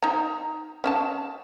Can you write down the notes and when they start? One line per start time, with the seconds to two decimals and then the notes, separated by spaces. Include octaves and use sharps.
0.03 D#4 A#5
0.84 C#4 E5 A5